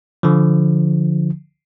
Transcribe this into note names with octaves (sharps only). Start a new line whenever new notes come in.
D3 F3